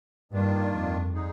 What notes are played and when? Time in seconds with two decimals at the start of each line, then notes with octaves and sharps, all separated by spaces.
0.32 G2 D#3 A#3 D4 F4
0.73 F2
1.13 D3 G#3 D#4 G#4